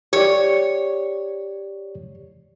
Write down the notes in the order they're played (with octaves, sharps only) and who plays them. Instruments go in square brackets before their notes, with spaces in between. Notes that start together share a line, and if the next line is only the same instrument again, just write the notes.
[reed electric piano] G4 D5 [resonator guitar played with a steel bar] C#5